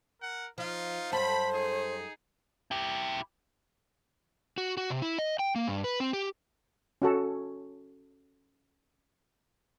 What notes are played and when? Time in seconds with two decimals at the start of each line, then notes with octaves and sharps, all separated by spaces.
0.20 A#4 F#5
0.58 F3 D#4 F4
1.12 F#2 G3 A4 C5 B5
1.52 D#4 G#4
2.71 E4 G4
4.58 F#4
4.77 F#4
4.90 C3
5.02 E4
5.19 D#5
5.39 G5
5.56 A#3
5.68 G2
5.84 B4
6.00 C4
6.13 G4
7.02 C#4 F#4 A4